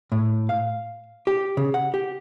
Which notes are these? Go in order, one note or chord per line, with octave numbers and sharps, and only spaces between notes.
A2
F5
G4
C#3
F#5
G4